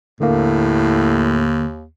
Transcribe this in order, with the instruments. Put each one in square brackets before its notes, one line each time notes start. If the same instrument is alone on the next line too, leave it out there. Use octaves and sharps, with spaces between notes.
[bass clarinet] D#2 [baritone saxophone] A2 [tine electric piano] D3 A#3